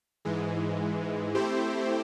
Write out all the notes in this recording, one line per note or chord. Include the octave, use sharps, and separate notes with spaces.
G#2 E3 G#3
A3 C4 E4 G4 C5